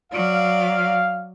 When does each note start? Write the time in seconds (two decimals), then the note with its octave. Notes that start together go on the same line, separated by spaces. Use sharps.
0.13 F#3 D5 F5